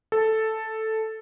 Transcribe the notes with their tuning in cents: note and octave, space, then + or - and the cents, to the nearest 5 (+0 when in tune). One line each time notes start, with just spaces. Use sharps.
A4 +0